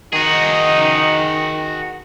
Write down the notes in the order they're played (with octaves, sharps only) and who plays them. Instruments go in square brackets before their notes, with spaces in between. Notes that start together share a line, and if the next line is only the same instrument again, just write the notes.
[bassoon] D#3 [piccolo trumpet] D#4 [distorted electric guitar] F#4 G#4